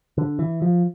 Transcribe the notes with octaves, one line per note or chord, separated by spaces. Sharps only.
D3
E3
F3